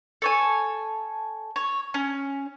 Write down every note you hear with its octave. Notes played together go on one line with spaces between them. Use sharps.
A4 C#5 G#5
C#5
C#4